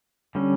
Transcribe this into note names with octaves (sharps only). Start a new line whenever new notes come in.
D3 G3 C#4